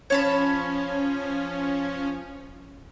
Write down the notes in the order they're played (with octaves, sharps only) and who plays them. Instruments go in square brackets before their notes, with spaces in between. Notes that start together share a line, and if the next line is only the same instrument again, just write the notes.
[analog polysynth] F3 C#4 [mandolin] C#5 A5 B5